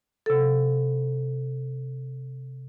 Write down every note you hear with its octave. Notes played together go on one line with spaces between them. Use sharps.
C3 A4